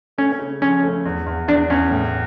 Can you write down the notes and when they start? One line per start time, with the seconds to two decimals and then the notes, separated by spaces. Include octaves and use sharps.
0.18 A3 C#4
0.39 C#3
0.62 F3 C#4
0.83 A3
1.05 E2
1.26 E2
1.48 E2 D4
1.70 E2 C#4
1.91 A2